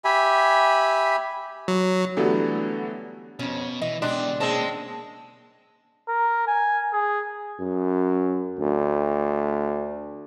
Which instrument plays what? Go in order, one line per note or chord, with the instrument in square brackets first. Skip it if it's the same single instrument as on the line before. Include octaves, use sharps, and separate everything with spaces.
[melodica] G4 E5 G#5 B5
[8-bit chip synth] F#3
[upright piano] D3 E3 F#3 G3 A3 B3
[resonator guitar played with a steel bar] F2 C#4 [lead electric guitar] B2
[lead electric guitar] E3 [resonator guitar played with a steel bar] D#5
[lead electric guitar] B2 G4 [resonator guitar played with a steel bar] G#3 [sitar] D4
[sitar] G#3 C4 [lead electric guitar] A#3 C#4 [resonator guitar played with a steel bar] A5
[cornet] A#4
G#5
G#4
[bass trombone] F#2
D2